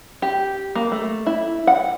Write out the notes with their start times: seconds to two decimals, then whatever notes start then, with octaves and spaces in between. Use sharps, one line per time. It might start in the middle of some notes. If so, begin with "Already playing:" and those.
0.22 G4
0.75 A#3
0.92 A3
1.26 E4
1.67 F#5